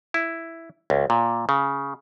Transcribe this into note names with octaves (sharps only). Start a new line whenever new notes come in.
E4
C#2
A#2
C#3